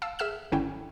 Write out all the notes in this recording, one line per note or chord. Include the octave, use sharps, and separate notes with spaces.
F5 A5 E6
G#4 E5 E6 F6 E7
G#1 D3 C#4 E4 G5